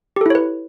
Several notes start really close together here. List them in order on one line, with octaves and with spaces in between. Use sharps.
G4 A4 E4 C#5 B4